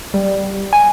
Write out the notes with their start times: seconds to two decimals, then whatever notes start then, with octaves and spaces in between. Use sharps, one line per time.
0.14 G3
0.73 G#5